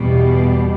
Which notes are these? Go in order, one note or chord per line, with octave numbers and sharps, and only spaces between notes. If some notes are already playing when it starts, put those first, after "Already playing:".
Already playing: E2 B2 G3